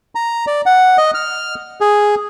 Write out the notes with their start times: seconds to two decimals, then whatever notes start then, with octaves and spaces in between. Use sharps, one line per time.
0.15 A#5
0.47 D5
0.66 F#5
0.98 D#5
1.14 F6
1.81 G#4